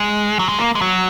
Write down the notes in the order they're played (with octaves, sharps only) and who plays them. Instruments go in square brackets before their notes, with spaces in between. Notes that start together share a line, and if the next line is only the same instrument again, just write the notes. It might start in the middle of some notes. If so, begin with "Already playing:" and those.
Already playing: [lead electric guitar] G#3
F#3
G#3
A#3
G#3
F#3